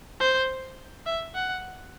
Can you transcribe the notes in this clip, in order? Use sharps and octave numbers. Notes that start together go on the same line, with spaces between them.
C5
E5
F#5